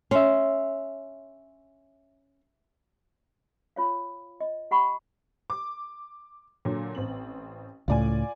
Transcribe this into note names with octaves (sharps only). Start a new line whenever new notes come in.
C#4 E5 C6
F4 C#5 F5
D#5
G4 F#5 B5 C#6
D6
A#2 D3 F#3
A1 C4 F#7
C#2 A2 F4 D5 G#5